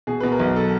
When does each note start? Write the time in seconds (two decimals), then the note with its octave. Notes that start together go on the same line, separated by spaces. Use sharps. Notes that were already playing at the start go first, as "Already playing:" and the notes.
0.07 B2 G#4
0.20 B2 B4
0.32 A#4
0.39 B1
0.56 A4